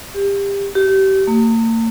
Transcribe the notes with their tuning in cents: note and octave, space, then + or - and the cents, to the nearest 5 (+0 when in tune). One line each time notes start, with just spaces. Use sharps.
G4 +25
G4 -30
A#3 -45